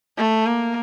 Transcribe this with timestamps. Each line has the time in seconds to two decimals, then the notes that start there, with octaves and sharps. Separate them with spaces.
0.18 A3
0.46 A#3